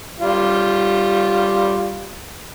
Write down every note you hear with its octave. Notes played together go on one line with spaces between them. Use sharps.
G3 F4